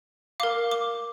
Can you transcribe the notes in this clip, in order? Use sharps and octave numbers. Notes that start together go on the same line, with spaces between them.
A#4 F5 D6
D6